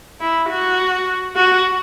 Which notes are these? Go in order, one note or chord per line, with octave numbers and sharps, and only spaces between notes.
E4
F#4
F#4